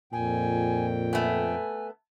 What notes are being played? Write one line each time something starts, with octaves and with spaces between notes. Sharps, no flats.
F2 A#2 G5 G#5
A3 B3 G#5